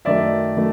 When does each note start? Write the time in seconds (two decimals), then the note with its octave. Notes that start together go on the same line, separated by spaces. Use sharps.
0.05 F#2 D#3 F#3 A3 D5 E5
0.57 D#3 F#3 A3